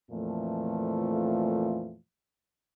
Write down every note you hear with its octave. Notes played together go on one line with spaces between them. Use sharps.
F2 A#2 E3 F3 A3